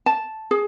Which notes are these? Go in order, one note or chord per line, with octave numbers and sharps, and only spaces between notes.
A5
G#4